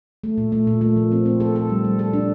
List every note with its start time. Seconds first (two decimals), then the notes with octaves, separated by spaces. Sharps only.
0.24 A3
0.38 A#2
0.52 A3
0.67 A#2
0.81 A3
0.96 F3
1.12 C4
1.26 C4
1.40 A4
1.55 A4
1.69 G3
1.84 G3
1.99 A4
2.13 D4